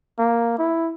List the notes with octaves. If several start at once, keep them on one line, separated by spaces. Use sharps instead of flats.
A#3
E4